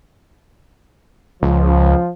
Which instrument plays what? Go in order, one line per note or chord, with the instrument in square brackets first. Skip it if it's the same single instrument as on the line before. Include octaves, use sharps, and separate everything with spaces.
[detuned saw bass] C#2 [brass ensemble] F3